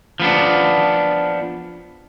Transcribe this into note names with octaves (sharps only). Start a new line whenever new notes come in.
F3 B3 D4